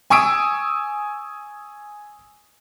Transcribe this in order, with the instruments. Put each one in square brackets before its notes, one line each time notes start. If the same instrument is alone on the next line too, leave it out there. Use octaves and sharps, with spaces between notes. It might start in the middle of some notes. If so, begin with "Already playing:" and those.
[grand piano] G#5 C#6 D#6 E6 D7